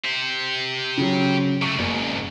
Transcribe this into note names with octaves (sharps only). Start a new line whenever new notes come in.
G4 C5
C#3 F#3
C3 A3 C#6
F#1 C2 G#2